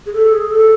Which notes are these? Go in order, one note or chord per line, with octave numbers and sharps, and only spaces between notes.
G#4
A4
G#4
A4